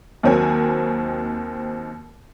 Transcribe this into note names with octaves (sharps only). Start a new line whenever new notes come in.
D#2 D#3 F#3 C4 A#4 G#5